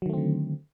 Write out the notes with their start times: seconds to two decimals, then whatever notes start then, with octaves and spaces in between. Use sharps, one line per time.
0.02 F#3
0.06 D#3
0.10 A3
0.13 C4
0.17 D3